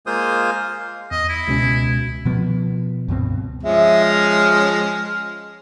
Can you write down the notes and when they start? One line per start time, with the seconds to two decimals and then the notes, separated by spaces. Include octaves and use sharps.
0.06 G#3 A#3 F4 C5 D#6
1.11 E2 D#5
1.29 E4
1.48 C#2 B2 C#4
2.25 B2 F3 B3
3.08 C#2 G2 B2 C4
3.63 F3 G#3 C#4 E5
4.02 F6